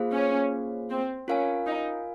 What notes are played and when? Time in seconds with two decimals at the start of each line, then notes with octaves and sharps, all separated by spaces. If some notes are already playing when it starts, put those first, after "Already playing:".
Already playing: A#3 F4 G#4 C5 F5
0.13 C#4
0.90 C4
1.28 C#4 F4 A#4 F5 G#5
1.66 D#4